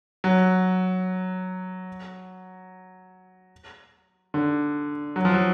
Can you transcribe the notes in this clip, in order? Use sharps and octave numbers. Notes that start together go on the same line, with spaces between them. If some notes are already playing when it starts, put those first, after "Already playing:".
F#3
D3
F#3
F3
F#3